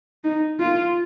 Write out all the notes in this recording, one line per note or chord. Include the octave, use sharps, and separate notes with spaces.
D#4
F4